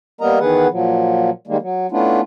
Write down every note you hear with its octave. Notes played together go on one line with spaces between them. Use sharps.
G3 A#3 B3 A#4 D#5 A#5
D#3 E3 B3 G#4 B4 F#5
A#2 F3 F#3
D#3 G3 G#3 A#3
F#3
A3 B3 C#4 D4 E4 F4